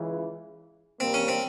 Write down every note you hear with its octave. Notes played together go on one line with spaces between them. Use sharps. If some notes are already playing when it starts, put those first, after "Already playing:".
Already playing: C#2 C#3 E3
G2 G3 A#3 C4
C#4
C4